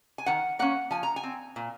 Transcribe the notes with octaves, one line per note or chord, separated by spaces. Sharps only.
G#5
D#3 F#5
A#3 C#4 F#5
F3 G#5
A#5
G#5
C4
A#2